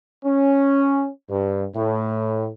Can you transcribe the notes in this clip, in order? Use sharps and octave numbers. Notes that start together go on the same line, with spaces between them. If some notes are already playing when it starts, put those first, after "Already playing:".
C#4
G2
A2